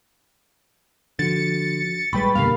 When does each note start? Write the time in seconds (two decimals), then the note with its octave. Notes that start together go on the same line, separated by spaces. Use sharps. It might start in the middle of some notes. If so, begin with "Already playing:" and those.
1.19 D3 F3 F#4 A6 C#7
2.13 A1 G3 G#3 B4 G5 B5 C#6
2.35 F2 B2 D3 A#3 G4 A#4 F5